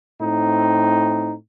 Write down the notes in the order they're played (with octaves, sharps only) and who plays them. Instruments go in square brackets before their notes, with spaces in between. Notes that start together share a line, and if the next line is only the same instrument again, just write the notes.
[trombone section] A2 C4 D#4